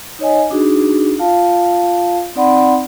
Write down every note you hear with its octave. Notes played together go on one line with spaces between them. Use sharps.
D#4 C#5 D#5 G#5
D4 D#4 F#4 G#4
F4 F5 A5
C4 D#4 D5 F#5 B5 C6